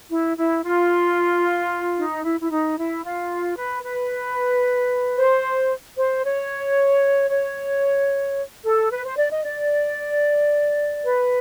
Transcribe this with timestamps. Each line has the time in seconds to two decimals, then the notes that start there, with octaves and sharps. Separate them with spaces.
0.10 E4
0.37 E4
0.64 F4
1.97 D#4
2.24 E4
2.40 E4
2.50 D#4
2.77 E4
3.04 F4
3.57 B4
3.84 B4
5.17 C5
5.98 C5
6.24 C#5
7.30 C#5
8.64 A4
8.90 B4
9.04 C5
9.17 D5
9.30 D#5
9.44 D5
11.04 B4